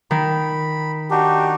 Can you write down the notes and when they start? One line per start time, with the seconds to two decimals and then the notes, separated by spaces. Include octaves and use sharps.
0.11 D#3 B5
1.11 D4 D#4 F#4 G4